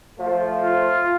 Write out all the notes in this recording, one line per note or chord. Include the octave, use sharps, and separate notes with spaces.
F3 A3
F4